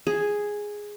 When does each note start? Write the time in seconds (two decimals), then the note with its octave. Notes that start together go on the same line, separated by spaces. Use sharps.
0.07 G#4